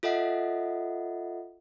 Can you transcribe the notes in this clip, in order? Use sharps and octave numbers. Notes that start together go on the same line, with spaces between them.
F4 A4 D#5 E5 F#5